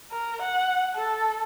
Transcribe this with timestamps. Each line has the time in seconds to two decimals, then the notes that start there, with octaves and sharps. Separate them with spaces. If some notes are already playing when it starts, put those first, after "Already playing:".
0.11 A#4
0.42 F#5
0.95 A4